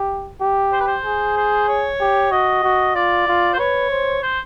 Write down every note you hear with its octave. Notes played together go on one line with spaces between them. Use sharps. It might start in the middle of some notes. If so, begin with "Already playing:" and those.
Already playing: G4
G4
C5
B4
C5
G#4
C5
C#5
G4
F#4 D#5
F#4
F4 D5
F4
C5
B4 C#5
C5
C5